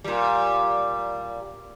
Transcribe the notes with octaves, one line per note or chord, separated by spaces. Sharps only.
A#2 G3